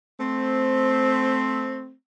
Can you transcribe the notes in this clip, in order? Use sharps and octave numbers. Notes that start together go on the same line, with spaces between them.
A3 C4